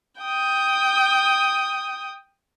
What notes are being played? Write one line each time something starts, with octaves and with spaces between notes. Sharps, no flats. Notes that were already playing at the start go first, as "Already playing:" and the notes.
G5 D#6